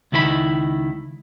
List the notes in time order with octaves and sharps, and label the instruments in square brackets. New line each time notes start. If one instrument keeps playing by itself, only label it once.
[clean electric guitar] C#2 D#3 E4 B4 B5